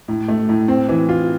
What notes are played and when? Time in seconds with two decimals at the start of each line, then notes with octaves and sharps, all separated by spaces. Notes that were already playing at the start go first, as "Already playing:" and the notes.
0.08 A2
0.28 A3
0.49 A2
0.68 C4
0.89 E3
1.09 F4